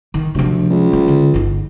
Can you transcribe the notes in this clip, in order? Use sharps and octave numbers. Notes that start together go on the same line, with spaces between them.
D#3
D2 C3 F3
C#2
F#3
D3
G1 D#4